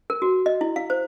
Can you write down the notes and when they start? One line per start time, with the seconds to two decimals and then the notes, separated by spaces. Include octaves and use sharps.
0.10 A#4
0.22 F#4
0.46 D#5
0.61 E4
0.76 F5
0.90 C5